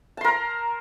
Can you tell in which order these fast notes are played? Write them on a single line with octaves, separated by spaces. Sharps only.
A5 C6 A#4 A#5